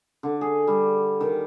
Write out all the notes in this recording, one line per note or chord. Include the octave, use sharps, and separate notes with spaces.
D3
G#4
G3
D#3